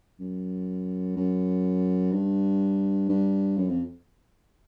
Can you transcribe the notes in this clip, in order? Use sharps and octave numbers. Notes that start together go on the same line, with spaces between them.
F#2
F#2
G2
G2
F#2
F2